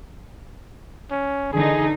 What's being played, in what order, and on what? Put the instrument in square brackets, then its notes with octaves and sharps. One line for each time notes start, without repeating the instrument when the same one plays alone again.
[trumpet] C#4
[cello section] D3 E3 D#4 [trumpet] G#4